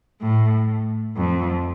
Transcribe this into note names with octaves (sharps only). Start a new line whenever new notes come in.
A2
F2